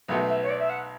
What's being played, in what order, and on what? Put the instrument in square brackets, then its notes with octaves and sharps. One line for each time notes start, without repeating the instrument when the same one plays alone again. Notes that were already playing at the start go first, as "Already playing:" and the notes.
[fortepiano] B1 B2 A3 [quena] F#5
[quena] E5
C#5
D5
E5
F#5